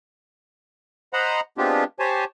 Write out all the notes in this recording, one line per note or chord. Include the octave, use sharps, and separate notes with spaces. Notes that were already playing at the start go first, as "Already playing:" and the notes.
C5 D#5 F#5 A#5 B5
G#3 B3 C4 D4 F4 G4
G4 C5 C#5 G#5 A5